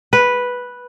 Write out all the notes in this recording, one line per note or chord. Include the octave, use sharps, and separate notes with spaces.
B4